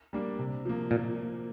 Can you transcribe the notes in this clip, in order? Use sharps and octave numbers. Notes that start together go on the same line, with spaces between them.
G3 A#3 D4
C3
F3 A#3
A#2